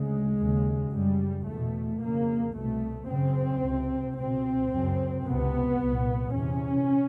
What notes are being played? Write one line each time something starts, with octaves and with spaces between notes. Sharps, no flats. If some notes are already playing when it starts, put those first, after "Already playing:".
Already playing: D2 C#3 G#3
D#2 C#3
F#2 C#3 G3
E2 A3
B2
F2 C#3 A#3
C2 B2 A3
F#2 C#3 C4
C#2 C3
C#2 B2 C4
F#2 C#3
C#2 C3 B3
C2 A#2
E2 C3 C#4